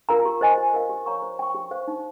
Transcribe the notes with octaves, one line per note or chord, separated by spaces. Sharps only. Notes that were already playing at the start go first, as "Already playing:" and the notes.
F4 A#4 F5 A#5
G4
C5 D#5 G#5
G4
A#4 F5
G4
C#5 F5 A#5 C#6
C5
G5 C#6
G4
C5 F5
D#4